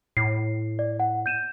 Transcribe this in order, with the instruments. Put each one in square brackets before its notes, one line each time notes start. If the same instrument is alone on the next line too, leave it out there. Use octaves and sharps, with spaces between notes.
[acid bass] A2 [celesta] C7
[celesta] D5
F#5
G6 D#7 E7